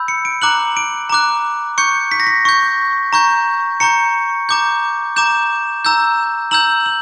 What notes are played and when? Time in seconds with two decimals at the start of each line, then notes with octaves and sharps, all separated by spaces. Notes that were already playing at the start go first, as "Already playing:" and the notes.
Already playing: B5 E6 G6
0.08 C#7
0.25 D7
0.42 A#5 D6 F#6 F#7
0.77 D7
1.10 A#5 D6 F#6
1.78 C#6 G6 C#7
2.11 B6
2.20 A#6
2.27 B6
2.45 C#6 G6
3.13 A#5 C#6 G6
3.80 A#5 C#6 G6 C#7
4.49 A#5 D6 G6
5.16 A#5 D6 G6 E7
5.85 A#5 E6 G6
6.51 A#5 E6 G6 F#7
6.86 F#7